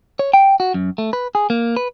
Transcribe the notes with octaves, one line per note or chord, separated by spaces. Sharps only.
C#5
G5
F#4
F#2
A3
B4
G#4
A#3
B4